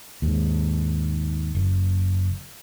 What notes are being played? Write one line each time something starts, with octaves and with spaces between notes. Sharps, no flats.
D#2 G#2
F#1